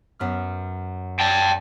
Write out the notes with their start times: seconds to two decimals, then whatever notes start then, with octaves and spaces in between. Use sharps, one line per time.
0.19 F#2 B3 F6
1.20 D5 G5 A5